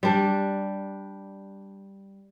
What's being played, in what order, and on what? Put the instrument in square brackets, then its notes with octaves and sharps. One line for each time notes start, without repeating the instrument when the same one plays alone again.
[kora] G3 D4